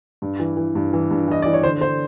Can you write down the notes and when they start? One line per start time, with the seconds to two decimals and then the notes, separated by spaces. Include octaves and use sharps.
0.22 G2
0.40 E3
0.57 E3
0.75 G2
0.93 E3
1.11 G2
1.28 E3 D#5
1.42 E3 D5
1.53 C#5
1.63 D3 C5
1.81 D3 C5